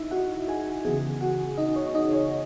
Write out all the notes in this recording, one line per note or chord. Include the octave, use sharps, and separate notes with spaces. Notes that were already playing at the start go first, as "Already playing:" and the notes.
Already playing: D#4 E4 D#5 E5
F#4 F#5
G#4 G#5
C#3 E3 B3 G#4 G#5
F#4 F#5
D#4 D#5
C#5
D#4 D#5
C#5